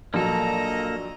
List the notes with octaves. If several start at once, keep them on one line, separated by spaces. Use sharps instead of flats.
A#1 F#3 A#3 A4 D#5 A#5